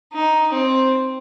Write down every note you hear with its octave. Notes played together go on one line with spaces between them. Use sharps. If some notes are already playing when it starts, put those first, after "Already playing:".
D#4
C4